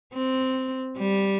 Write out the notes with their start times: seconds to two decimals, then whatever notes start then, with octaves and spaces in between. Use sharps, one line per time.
0.13 C4
0.98 G3